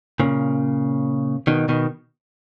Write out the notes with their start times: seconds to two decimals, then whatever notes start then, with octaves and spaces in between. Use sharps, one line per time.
0.20 A#2 C#3
1.47 B2 D#3
1.69 B2 D#3